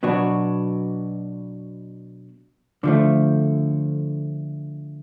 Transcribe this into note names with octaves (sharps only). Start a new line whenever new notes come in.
B2 F#3 B3 D4 F#4
D3 F3 A3